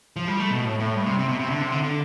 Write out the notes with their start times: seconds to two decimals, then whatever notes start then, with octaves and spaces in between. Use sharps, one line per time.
0.16 F3
0.28 G3
0.39 A3
0.50 B2
0.65 A2
0.79 A2
0.95 G2
1.06 C3
1.19 C3
1.28 B2
1.39 C3
1.50 D3
1.62 C3
1.72 D3
1.84 D3